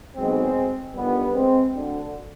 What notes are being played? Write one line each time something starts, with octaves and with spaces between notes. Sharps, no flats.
B1 B2 G#3 C4
G1 G2 D#3 G3 B3
G#3 C4
D2 D3